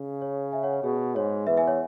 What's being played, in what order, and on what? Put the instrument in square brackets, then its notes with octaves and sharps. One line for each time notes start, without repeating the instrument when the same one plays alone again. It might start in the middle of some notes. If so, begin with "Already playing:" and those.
Already playing: [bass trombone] C#3
[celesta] C#5
E5 G#5
C#5 F#5
C#5
[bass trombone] B2 [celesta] G#4
[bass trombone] G#2 [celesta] C#5
[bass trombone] E2 [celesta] B4 E5
[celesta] E5 G#5
C#5 F#5